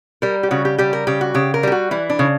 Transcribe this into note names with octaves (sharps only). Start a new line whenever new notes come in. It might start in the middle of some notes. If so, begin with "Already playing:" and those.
G3 A#4
G4
C#3 F#4
G4
G3 G4
A#4
C#3 G4
F#4
C#3 G4
A#4
G3 G4
F#4
E3 E4
D4
C#3